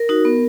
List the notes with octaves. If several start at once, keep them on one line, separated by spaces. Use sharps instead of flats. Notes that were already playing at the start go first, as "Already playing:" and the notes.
Already playing: A#4
D#4 F#4
B3